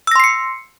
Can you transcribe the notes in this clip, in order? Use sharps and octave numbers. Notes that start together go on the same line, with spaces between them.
C6 E6 A#6 C7 C#7